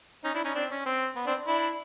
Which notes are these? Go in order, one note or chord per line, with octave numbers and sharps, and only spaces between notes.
C#4 D#4
D4 E4
C#4 D#4
C4 D4
C#4
C4
B3
C4 D4
D4 E4